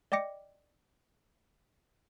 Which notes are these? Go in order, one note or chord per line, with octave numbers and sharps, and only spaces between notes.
D5 D#5 G5 D6 A#6 C#7